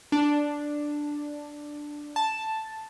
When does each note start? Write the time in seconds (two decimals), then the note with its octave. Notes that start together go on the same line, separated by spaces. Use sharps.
0.12 D4
2.16 A5